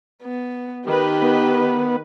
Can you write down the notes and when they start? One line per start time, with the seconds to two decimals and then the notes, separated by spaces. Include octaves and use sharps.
0.23 B3
0.87 D#3 G4 B4
1.22 B3